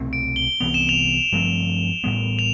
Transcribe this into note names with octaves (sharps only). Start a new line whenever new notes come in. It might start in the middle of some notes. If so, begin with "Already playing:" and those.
Already playing: C2 B2 A3 C4
D7
G7
C2 C3 E3 B3 F7
E7
F7
G2 F3 A3 C4
A1 A2 G3 B3
F7